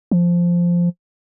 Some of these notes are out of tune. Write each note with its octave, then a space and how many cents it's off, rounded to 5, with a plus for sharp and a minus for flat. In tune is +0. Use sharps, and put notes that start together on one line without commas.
F3 -5